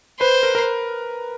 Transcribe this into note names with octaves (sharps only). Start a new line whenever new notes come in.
B4 C5
A#4
A#4